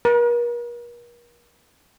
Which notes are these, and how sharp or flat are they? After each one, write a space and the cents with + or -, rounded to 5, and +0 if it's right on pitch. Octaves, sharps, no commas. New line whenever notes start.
A#4 +45